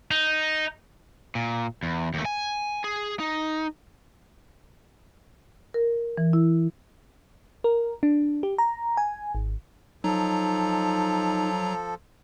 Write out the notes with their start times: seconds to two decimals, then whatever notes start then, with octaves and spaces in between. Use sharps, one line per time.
0.11 D#4
1.35 A#2
1.83 E2
2.14 D#2 A3
2.25 G#5
2.84 G#4
3.20 D#4
5.74 A#4
6.17 E3
6.33 E4
7.64 A#4
8.03 D4
8.43 G4
8.58 A#5
8.97 G#5
9.35 G#1
10.04 F3 F#3 D#4 A4 A#5